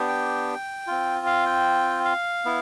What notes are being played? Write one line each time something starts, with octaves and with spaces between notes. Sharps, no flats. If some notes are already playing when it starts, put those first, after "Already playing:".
Already playing: B3 D4 G4
G5
C4 F4
F5
G5
F5
B3 E4